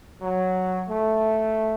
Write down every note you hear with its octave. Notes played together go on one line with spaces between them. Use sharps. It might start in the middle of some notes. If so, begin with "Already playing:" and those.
F#3
A3